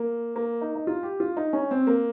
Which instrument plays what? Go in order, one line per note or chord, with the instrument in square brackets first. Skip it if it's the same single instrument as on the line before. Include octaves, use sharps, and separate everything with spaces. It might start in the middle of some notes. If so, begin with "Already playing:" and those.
Already playing: [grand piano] A#3
A#3
D#4
D#4
F4
G4
F4
D#4
C#4
C4
A#3